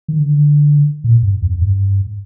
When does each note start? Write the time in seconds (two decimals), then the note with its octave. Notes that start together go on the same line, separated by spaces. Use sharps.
0.08 D#3
0.19 D3
1.04 A#2
1.23 G2
1.42 F2
1.62 G2